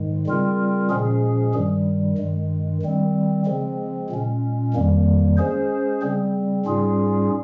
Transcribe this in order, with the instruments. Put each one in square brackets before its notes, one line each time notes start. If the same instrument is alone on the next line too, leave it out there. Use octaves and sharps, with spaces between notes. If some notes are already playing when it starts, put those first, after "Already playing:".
Already playing: [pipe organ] G#2 D#3 G#3
C#3 G3 C4 F4 A#4
A#2 F3 G#3 C#4 G#4
G2 D#3 G3
G2 D#3 G#3
D#3 G3 C4
C#3 F3 G#3 C4
A#2 G#3 C#4
F2 D#3 G3 A#3
G#3 C#4 G#4 C5
C#3 G3 C4
G#2 G3 C#4 F4 G#4